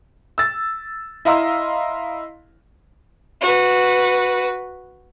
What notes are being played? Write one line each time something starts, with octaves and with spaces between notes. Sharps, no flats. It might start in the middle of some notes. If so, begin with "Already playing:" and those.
E6 A6
E4 D#5 F5 A#5 C6 E6
F#4 B4